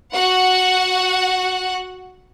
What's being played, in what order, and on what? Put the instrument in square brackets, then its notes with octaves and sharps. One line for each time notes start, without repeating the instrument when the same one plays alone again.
[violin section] F#4 F#5